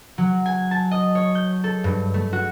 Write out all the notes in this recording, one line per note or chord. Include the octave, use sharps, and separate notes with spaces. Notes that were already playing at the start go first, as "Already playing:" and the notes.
F#3
G#5
A5
D#5
C#5
G6
A4
G2
A3
F#4